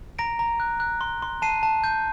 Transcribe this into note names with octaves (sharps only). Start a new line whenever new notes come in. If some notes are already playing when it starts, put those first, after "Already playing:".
A#5 A#6 D7
A#5
F#6
F#6
C6
C6
A5 C7 D#7
A5
G6